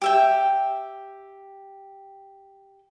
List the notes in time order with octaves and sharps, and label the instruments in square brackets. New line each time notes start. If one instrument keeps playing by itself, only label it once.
[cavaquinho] G4 E5 G5